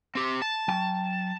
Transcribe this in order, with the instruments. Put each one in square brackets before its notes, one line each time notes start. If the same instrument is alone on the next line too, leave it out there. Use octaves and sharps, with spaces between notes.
[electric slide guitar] C4 G4
A5
[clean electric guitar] F#3 G5